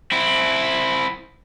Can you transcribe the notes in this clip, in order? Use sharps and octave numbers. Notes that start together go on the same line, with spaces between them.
C4 E4